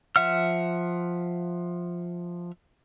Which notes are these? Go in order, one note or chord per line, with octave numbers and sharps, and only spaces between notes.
F3 E5 F#5 F6